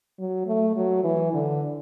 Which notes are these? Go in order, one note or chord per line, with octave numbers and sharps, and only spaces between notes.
F#3
A3
F#3
E3
D3